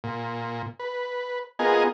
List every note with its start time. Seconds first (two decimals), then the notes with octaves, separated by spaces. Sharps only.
0.04 A#2
0.80 B4
1.59 B3 F4 G#4 A#4 D#5 G#5